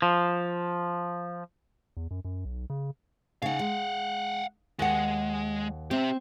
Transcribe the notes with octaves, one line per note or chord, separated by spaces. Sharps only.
F3
E2
F#2
F#2
B1
C#3
C#3 D#4 F5 F#5
G#3
D#2 G#3 F#5
C4 G4 E5